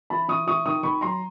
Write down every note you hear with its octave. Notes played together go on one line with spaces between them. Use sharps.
E3 A5 B5
E3 C#6 D#6
E3 C#6 D#6
D#3 C#6 D#6
D#3 B5 C#6
F#3 A#5 C6